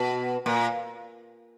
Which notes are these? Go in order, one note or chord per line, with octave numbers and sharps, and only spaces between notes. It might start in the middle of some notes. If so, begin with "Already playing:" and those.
Already playing: B2
A#2